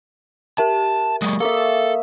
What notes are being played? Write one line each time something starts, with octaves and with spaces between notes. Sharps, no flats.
G4 A#4 E5 A5
F#3 G#3 C#6 D#6
A#3 A4 E5